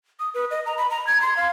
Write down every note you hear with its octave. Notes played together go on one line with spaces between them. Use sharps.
D#6
B4
D#5
A#5
B5
A#5
G#6
C6
F5